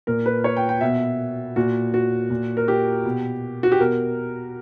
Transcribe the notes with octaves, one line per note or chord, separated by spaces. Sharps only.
A#2 A#4
B4
C#5
G5
G5
B2 E5
A#2 F#4
F#4
A#2
A#4
G4
B2
F#4
G4
B2 A#4